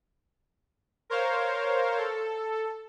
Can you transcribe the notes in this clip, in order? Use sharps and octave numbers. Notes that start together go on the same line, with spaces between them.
A#4 C5 C#5 F5
A4